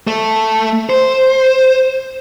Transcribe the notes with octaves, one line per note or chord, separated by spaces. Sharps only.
A3
C5